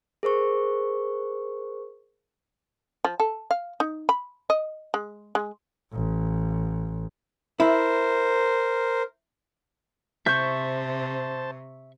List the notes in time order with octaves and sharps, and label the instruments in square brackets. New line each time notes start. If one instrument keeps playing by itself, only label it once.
[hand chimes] G#4 A#4 C5 C#6
[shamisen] F3
A4
F5
D#4
B5
D#5
G#3
G#3
[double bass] A1
[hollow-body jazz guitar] E4 [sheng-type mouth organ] A#4 C5
[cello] C3 [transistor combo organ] C5 A5 [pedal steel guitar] E5 C#6 [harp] G6